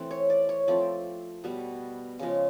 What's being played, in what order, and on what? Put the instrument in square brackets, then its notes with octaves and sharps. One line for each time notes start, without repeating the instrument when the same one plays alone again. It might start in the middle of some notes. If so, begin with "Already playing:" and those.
Already playing: [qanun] E3 A3 C4
C#5
D5
C#5
F3 A3 C4 D5
B2 G3 B3
C#3 F3 G#3